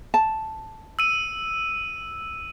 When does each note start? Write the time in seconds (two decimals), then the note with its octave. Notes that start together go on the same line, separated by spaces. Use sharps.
0.14 A5
0.99 E6 D#7